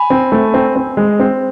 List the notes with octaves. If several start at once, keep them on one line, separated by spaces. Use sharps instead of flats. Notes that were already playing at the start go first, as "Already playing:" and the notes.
Already playing: G#5 B5
C4
A3
C4
C4
G#3
C4